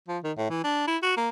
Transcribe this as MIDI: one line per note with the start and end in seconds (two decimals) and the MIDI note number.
0.09 0.19 53
0.24 0.32 51
0.37 0.49 45
0.50 0.60 52
0.64 0.86 62
0.88 0.97 64
1.03 1.17 66
1.17 1.29 58